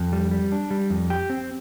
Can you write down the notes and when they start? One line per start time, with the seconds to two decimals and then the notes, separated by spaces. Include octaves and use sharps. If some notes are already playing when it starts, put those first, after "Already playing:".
Already playing: F2
0.13 G3
0.31 G3
0.52 D4
0.71 G3
0.90 F2
1.10 G4
1.30 C4